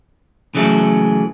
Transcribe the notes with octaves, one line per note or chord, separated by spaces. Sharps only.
C#3 E3 F#3 G#3 A3